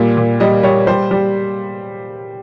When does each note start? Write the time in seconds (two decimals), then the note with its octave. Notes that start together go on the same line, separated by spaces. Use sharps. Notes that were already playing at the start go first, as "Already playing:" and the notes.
Already playing: A#2 G3
0.17 A#2
0.40 G3 D#5
0.63 G3 C#5
0.87 G3 C5
1.11 G3